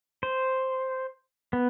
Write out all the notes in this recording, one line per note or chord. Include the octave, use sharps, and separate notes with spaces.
C5
B3